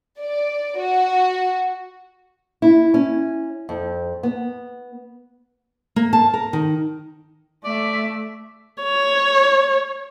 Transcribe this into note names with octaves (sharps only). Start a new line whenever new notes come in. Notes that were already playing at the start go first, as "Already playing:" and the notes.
D5
F#4
E4
C#4
F2
B3
A#3
A5
A#4
D#3
A3 D5 E5
C#5